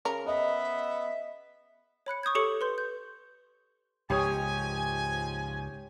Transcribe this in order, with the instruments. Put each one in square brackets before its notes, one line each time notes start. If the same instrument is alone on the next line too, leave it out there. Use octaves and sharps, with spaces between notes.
[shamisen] C#3 A#4 A#5
[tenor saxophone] B3 [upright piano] D#5 [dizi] E5
[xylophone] C#5 B5 F#6 C#7
C#6 D#6 G6 G#6
G4 A4 C#5 C#6 C#7
B4 C6 G6
G6
[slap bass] C#2 G#2 [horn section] F3 G#5 [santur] G4 C#5 D#6